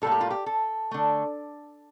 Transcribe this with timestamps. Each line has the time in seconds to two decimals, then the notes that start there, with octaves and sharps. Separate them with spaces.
0.02 A2 G3 A#3 A4
0.12 G4
0.21 F4
0.30 G4
0.46 A4
0.91 D3 A3